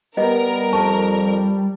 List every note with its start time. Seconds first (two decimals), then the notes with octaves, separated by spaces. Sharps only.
0.17 G3 B3 A#4 D#5
0.73 F2 A5 C#6